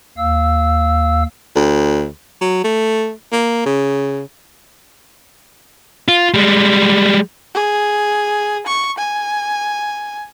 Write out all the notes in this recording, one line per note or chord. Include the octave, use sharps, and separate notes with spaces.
D#2 F5 E6
D2
F#3
A3
A#3
C#3
F4
G3 G#3
G#4
C#6
G#5